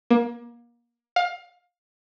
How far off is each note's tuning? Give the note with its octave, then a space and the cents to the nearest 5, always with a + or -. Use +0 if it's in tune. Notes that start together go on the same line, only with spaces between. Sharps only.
A#3 +30
F5 +25